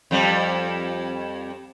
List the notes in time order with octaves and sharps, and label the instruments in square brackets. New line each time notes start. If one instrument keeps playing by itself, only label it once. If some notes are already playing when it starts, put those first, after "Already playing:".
[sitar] F2 G3